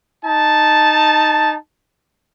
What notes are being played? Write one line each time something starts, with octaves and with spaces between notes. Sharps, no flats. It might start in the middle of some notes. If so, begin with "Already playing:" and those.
D#4 A5